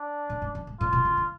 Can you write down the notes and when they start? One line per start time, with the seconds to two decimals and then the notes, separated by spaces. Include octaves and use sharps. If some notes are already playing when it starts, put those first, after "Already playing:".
Already playing: D4
0.30 A2
0.42 G#2
0.55 F#2
0.67 G#2
0.80 A2 F4
0.93 B2
1.05 C#3
1.17 D3